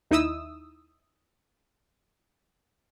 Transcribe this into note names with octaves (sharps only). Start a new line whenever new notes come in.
D#2 D#4 E4 D#6 E6